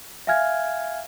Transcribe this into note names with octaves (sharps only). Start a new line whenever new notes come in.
E5 F5 G#5 F6 G#6